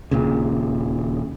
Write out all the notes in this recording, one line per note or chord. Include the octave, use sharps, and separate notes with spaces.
D#1 A#2 C#3